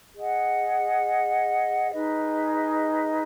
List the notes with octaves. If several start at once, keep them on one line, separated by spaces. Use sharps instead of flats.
G#4 D#5 F#5
D#4 G#4 B4 D#5